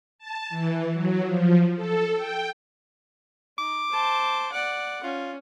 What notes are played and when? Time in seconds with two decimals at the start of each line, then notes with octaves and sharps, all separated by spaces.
0.19 A5
0.50 E3
0.93 F#3
1.23 F3
1.76 A4
2.16 G5
3.58 D#4 D6
3.91 C5 A5
4.52 D5 F#5
5.03 C#4 F4